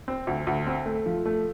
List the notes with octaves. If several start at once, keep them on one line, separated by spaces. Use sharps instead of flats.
C4
D2
D2
C4
A3
F3
A3